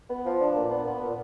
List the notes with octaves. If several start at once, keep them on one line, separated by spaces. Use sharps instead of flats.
B3
F3
D4
A#2
B3
B3
A#2